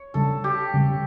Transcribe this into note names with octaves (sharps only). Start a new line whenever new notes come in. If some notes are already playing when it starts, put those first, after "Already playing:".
Already playing: C#5
C#3 G3 D4 A4
G4
C#3 G3 C#4